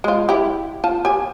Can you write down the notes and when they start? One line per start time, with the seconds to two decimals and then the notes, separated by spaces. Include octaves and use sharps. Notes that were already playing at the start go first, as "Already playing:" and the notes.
0.04 G#3 F4
0.29 E4 G4
0.84 F4 A5
1.05 G4 G#5